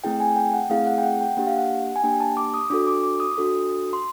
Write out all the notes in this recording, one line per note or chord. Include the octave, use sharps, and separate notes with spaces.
A3 C4 E4 G#4 G5
G#5
G5
F#5
A3 C4 E4 G#4 F5
F#5
G5
F#5
G5
A#3 D4 G4 F#5
F5
F#5
G#5
A#3 D4 G4 G5
A5
D6
D#6
D4 F#4 A4 D6
D6
D6
D#6
D4 F#4 A4
C6